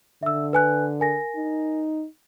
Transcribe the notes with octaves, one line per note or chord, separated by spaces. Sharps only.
D3 E5 E6
B4 G#5 F#6
A#4 G#5 A#6
D#4